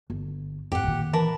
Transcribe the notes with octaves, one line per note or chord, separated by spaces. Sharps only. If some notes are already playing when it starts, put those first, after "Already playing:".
G1
F2 G#2 G4 F#5
A#2 D#3
E3 A#4 A5 B5